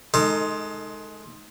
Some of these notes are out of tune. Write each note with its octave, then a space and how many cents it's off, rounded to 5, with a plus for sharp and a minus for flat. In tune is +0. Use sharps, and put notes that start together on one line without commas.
G#3 +25 D#4 +0 A4 +30